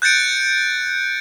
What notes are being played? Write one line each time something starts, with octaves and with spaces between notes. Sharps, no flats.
F#6 G6 A6 C#7 D7